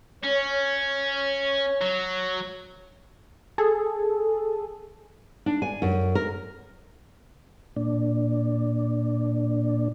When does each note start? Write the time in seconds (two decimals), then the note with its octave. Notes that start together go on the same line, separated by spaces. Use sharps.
0.24 C#4 C#5
1.82 F#3
3.58 G#4 A4
5.46 D4
5.62 G#5
5.82 F#2
6.15 A#4
7.76 A#2 D4